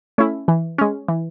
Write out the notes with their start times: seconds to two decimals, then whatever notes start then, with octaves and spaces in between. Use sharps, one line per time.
0.18 A3 C#4 E4
0.48 E3
0.78 G#3 C#4
1.08 E3